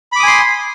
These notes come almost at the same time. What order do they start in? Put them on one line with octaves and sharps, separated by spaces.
B5 D6 D#6 G#5 C6